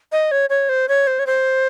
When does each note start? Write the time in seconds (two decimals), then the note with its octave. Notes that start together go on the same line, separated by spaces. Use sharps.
0.12 D#5
0.31 C#5
0.50 C#5
0.69 C5
0.89 C#5
1.07 C5
1.19 C#5
1.27 C5